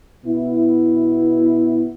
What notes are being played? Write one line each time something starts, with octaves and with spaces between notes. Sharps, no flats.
B2 B3 E4